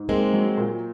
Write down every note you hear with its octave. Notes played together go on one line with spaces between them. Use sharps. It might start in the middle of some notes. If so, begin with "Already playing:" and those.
Already playing: G#2
G#3 A#3 C4
F#3
A#2